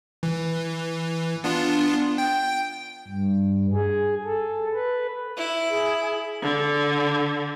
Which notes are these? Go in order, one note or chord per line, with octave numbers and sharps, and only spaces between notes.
E3
B3 D4 F4
G5
G2
G#4
A4
B4
E4
G#4
D3